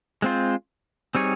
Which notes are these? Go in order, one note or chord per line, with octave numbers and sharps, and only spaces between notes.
G#3 C4 F4 C5
G3 C4 D#4 G#4 C#5